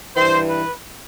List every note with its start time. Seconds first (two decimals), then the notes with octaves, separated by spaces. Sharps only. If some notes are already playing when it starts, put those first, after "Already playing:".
0.16 G2 E3 C5
0.49 B4